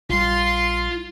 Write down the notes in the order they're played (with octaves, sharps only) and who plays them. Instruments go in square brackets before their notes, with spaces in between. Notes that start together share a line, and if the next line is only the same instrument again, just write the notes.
[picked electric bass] A#1 G3 [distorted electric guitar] F4 [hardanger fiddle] C6